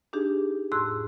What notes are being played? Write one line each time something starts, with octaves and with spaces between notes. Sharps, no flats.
D4 D#4 G4 G#4
F2 A2 G#4 C6 E6 F#6